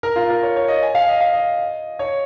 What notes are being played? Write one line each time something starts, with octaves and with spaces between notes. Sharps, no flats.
A#4
F4
A#4
C#5
C#5
D#5
G#5
F5
D#5
F5
D#5
C#5